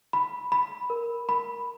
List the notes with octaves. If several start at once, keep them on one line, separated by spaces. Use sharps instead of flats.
B5
B5
A#4
B5